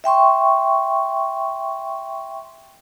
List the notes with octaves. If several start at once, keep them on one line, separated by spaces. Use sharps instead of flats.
E5 G5 C6 C#6